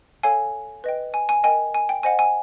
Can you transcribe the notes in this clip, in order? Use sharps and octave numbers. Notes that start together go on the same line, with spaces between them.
A4 C#5 F5 G#5
B4 D#5 G5
G#5
G#5
A#4 D#5 G5 G#5
G#5
G5
C5 D#5 F#5 G#5
G#5